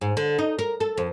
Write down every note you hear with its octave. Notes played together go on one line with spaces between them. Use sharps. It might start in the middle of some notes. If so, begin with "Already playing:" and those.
G#2
D3
D#4
A#4
A4
F2